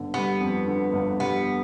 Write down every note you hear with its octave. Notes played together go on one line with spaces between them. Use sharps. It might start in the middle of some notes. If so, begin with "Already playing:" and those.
Already playing: G1 D3
G3 B3
F2
D3
G1
G3 B3